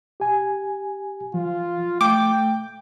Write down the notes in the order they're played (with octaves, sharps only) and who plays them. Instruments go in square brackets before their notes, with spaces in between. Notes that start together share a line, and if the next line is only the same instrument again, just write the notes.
[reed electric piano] G4 G#5
[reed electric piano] F3 [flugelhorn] F4
[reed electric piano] A3 [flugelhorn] G5 [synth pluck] D6